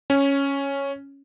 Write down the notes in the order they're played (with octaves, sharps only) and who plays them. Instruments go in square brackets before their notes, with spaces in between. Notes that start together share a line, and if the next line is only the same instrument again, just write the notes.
[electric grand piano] C#4